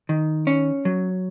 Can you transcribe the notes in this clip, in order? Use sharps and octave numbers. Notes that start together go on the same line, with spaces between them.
D#3
C#4
F#3